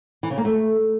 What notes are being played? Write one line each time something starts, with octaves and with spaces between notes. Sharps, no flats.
E3
C#3
A#3
A3